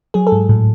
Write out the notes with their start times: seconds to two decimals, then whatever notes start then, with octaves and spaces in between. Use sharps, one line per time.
0.14 F#3 G#4
0.27 A4
0.32 G#2
0.49 A2